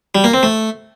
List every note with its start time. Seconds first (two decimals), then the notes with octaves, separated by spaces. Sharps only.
0.15 G3
0.24 A#3
0.34 C4
0.43 A3